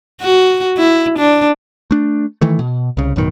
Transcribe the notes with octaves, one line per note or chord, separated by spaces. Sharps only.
F#4
E4
D4
A3 D4
D#3 E3 A3
B2
C2 C#3
A1 F#2 B2 D#3